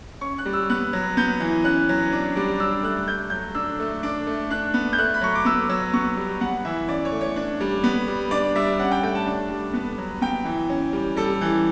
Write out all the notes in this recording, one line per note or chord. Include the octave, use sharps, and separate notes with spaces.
C#4 C#6
F#6
G3
E6
B3 F#6
F#3
B3 G6
E3
C#4 F#6
F#3
D4
G3 D6
D4 E6
A3 F#6
A3 G6
F#3 G6
D4 E6
A3
D4 D6
A3
D4 F#6
B3
G6
A3 F#6
B5
F#3 C#6
D6
B3 E6
F#3 E6
B3 C#6
G3
B3 F#5
E3 E5
C#4 D5
C#5
A3
C#5
D4
G3
B3
G3
D4 D5
G3 E5
C#4 F#5
G5
A3 G5
A5
D4
G3
B3
F#3
B3 G5
E3
C#4
G3
G3 A4
E3